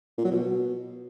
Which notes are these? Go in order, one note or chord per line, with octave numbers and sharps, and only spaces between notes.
A#2
F#3
B2